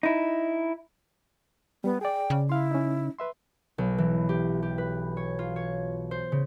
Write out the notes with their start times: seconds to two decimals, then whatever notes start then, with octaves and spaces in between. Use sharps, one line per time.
0.03 D#4 E4
1.84 G3 B3
2.01 G#4 D5 G5
2.30 C#3
2.49 E4 F5 C6
2.71 C#4 D#4
3.18 B4 E5 C6
3.78 B1
3.98 E3
4.29 G4
4.62 G4
4.78 B4
5.17 C#5
5.39 F4
5.56 C#5
6.11 C5
6.32 C#3